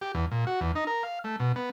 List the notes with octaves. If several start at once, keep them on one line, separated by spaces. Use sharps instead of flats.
G4
E2
A#2
F#4
E2
D#4
A#4
F5
A3
B2
B3